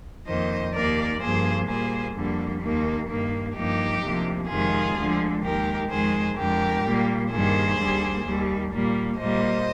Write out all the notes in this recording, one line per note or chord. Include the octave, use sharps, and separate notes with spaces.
F2 D#3 A#3 C5 D#5
D#2 D#3 A#3 A#4 D5
G2 F3 A#3 G#4 C5
A#2 G3 A#3 G#4 C5
F2 D3 G3 A#3
D#2 D#3 A#3
G2 D#3 A#3
G2 F3 A#3 D#4 G4
D2 C3 F3 A#3
F2 C3 D#3 G#3 F4 G#4
D2 D3 F3 G#3
D#2 D#3 G#3 G4 A#4
F2 D#3 G#3 G#4 C5
F2 D3 G#3 G4 A#4
A#2 G3 A#3
G2 D#3 G3 A#3 G#4 C5
D#2 D3 G3 A#3
D#2 D#3 G3
A#2 G3 A#3
A#2 G3 A#3 C5 D#5